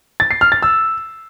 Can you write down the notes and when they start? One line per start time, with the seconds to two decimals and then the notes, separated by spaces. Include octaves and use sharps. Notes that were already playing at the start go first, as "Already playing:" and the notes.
0.20 A6
0.31 C7
0.41 F6
0.52 A6
0.62 E6